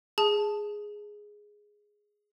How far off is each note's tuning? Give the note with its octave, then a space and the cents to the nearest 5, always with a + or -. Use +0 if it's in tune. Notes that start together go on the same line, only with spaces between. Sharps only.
G#4 +0 A5 -5